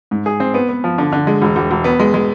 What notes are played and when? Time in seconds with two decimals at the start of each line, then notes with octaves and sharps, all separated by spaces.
0.11 G#2
0.26 G#4
0.40 C4
0.54 B3
0.69 B3
0.84 F3
0.98 D3
1.12 D3
1.27 G#3
1.42 E1
1.56 E1
1.71 E1
1.84 B3
2.00 G#3
2.14 G#3